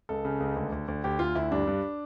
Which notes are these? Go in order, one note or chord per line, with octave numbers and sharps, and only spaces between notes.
C#2 A4
C#3
C#2
D2
D2
D2
D2 G4
D2 F4
D2 E4
G2 D4
G2